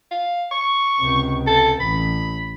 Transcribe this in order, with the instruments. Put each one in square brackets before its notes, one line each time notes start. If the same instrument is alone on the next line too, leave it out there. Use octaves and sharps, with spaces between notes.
[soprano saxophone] F5
C#6
[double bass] C#2 C3
[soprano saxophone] A4
[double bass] A1 [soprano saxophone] B5